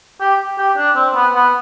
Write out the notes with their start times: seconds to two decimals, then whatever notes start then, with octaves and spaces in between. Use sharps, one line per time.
0.21 G4
0.59 G4
0.77 D4
0.96 C4
1.15 B3
1.34 B3